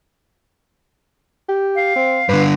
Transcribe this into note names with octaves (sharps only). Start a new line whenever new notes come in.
G4
F5
C4
G2 D3 B4